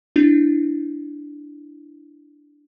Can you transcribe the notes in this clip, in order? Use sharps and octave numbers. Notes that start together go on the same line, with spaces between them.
D4 E4